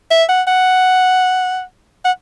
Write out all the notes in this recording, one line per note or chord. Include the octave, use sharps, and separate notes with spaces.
E5
F#5
F#5
F#5